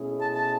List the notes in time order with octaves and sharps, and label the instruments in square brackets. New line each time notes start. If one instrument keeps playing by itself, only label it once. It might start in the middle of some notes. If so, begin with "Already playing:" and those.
Already playing: [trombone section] B2 A3 C#4 E4 G#4
[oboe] A5
A5